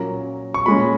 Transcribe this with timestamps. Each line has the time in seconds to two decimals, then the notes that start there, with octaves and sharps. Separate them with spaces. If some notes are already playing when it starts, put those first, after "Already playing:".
Already playing: A#2 F#3 A#3 C#4 A#5
0.54 C#6
0.66 A#2 G#3 C#4 B5